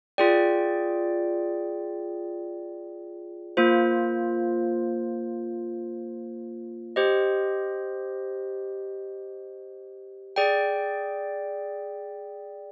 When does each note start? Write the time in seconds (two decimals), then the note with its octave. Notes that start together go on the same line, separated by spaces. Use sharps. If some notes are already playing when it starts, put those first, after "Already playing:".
0.18 F4 G#4 D5 G5
3.57 A#3 F4 C5
6.96 G4 C5 D#5
10.36 G#4 D5 G5